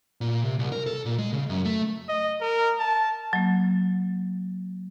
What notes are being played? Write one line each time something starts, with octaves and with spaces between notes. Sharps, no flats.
A#2
C3
C2
A#4
A4
A#2
G#3
C#3
F#2
A3
D#5
A#4
A5
F#3 A#3